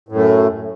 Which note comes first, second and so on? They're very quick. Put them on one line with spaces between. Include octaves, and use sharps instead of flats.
A2 F#2 A3